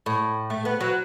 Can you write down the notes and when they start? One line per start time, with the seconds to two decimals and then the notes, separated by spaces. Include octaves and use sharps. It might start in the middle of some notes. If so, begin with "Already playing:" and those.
0.06 A2
0.50 A3
0.65 B3
0.81 F#3